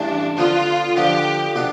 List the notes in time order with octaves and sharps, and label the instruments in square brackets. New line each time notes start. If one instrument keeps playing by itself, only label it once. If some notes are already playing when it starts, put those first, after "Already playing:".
Already playing: [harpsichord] A1 G2 E3 G3 [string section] D4
[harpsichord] D3 F3 B3 [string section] F4
[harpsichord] D3 F3 B3 [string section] G4
[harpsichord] B2 B3 D4